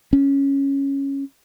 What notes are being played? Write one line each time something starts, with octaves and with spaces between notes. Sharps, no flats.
C#4